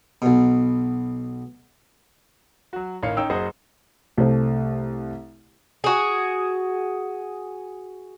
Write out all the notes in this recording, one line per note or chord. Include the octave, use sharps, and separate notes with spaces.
B1 B2
F#3 F#4
A1 D#3 C#5 F5 C#7
C#4 D#4 G5 E6
F#1 F#3 G#4 C5 D#5 F#5
C2 A3 C5
F#4 G#4